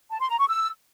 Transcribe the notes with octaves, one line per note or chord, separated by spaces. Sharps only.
A5
C6
A#5
C#6
E6